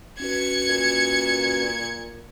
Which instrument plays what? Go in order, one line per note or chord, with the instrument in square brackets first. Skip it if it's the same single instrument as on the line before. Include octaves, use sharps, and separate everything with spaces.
[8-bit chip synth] C#4 F#4 B4 [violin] G#6 C#7
[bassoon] A#2